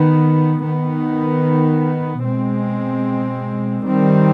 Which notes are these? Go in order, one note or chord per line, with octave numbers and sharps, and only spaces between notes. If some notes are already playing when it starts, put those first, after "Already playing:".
Already playing: D#3 B3
D#3 B3
B2 G#3 C4
D#3 G3 C4